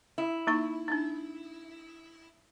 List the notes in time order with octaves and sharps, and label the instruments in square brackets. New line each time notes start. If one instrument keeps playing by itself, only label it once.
[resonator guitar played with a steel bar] E4
[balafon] A#3 D#4 C#6
D4 D#4